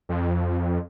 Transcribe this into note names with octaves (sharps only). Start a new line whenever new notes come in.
F2